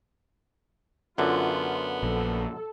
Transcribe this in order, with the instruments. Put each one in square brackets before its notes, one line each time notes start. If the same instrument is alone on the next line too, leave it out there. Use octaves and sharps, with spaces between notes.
[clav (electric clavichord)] F#2 D3 [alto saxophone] B3 [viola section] F4
[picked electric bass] A#1 [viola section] A4